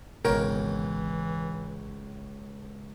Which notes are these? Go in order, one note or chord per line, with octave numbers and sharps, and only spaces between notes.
G#1 C#2 B2 E3 A#4 C#5 G5